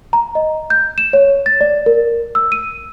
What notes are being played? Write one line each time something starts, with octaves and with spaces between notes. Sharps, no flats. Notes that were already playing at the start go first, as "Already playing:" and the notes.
A#5
D#5
G6
E7
C#5
A6
D5
A#4
E6
D#7